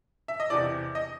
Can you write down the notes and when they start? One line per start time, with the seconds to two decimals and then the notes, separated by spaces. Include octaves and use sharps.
0.28 E5
0.40 D#5
0.50 E2 C3 E3 D5
0.95 D#5